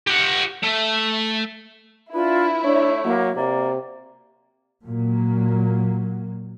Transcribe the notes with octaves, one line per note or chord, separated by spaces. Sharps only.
G4 F#5
A3
D4 E4 F4 B4
A3 D4 C#5
F#3 A#3
C3 A#3 D5
A#2 F#3 A#3